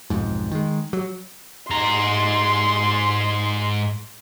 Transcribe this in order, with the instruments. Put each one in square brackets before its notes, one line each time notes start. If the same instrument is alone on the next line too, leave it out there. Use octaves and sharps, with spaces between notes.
[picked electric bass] B1 F2 G#2
D#3 G#3
F#3
[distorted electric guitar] G#2 A#5 [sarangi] C6